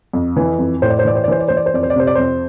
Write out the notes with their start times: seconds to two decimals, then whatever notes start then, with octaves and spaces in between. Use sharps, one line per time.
0.13 F2
0.37 E3
0.59 F2
0.82 A2 C5
0.90 D5
0.99 C5
1.05 E3 D5
1.15 C5
1.24 D5
1.28 E3 C5
1.40 D5
1.48 E3 C5
1.57 D5
1.66 C5
1.74 F2 D5
1.83 C5
1.90 D5
1.96 C3 C5
2.07 D5
2.15 F2 C5